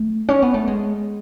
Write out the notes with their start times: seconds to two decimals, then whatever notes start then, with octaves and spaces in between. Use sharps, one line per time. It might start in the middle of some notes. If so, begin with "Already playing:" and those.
Already playing: A3
0.29 C#4
0.42 B3
0.54 A3
0.67 G#3